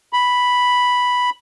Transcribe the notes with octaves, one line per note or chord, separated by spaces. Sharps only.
B5